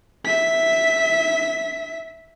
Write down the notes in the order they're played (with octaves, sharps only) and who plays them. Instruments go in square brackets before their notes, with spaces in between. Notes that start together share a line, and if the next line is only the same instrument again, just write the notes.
[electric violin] E5 B6